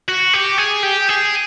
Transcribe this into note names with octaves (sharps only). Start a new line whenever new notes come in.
F#4
G4
G#4
G4
G#4